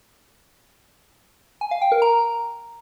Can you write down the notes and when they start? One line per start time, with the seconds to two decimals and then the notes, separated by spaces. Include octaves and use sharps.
1.61 G#5
1.71 F5
1.82 G5
1.92 A#4
2.02 A#5